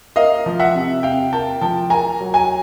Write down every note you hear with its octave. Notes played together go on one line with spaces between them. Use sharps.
A#3 D#5 F5
F3
E5 F#5
C3
C3 F5 G5
A#3 G5 A5
F3 G5 A5
A#3 G#5 A#5
F#3
G#5 A#5